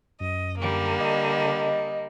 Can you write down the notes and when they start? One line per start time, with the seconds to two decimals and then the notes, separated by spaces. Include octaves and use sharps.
0.20 F#2 D#5
0.60 D3 G3 A#3
1.00 D#5